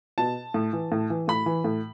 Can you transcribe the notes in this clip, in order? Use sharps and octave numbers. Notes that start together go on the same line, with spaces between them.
B2 A5
A2
E3
A2
E3
A2 B5
E3
A2